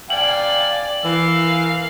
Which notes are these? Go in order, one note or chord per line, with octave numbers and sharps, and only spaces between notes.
D5 F5 G5 G#5 F#7
E3 A#4 F5 E6